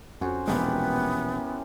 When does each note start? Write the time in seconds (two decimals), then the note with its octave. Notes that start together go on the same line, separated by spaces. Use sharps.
0.21 F2 C#4 F#4 C5
0.47 E1 A#1 E3 G#3 B3 G4 A#4